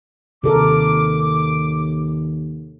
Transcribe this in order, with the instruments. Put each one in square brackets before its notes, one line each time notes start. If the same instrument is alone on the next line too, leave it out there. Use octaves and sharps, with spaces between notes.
[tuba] D#2 [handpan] C3 A4 A#4 [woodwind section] D6